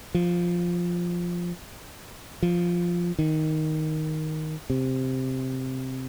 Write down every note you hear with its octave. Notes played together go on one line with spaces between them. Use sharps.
F3
F3
D#3
C3